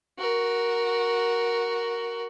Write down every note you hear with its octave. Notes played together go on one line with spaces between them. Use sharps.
F#4 A#4